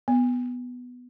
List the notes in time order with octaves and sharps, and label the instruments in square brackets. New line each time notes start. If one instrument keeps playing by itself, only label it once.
[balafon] B3